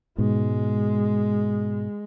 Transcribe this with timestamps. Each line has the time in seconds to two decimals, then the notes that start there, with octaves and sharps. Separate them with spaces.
0.18 G#2 B2 G#3